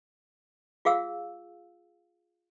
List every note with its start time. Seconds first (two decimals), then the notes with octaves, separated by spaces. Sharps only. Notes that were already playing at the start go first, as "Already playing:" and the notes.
0.85 F4 G#4 F5 E6